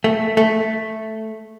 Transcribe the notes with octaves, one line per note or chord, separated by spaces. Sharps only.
A3
A3